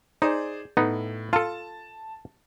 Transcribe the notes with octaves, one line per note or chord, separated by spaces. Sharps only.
D#4 G#4 C5 D5
A2 B3 D#4
F4 A4 A5